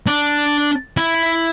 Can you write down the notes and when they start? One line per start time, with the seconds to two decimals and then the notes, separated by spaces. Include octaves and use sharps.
0.07 D4
0.97 E4